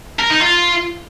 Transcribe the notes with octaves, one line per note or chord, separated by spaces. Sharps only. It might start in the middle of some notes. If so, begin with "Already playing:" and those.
A#4
D#4
F4